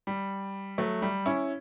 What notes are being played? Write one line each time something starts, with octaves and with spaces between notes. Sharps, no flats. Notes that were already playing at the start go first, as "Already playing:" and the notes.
G3
F#3 A3
G3
C#4 E4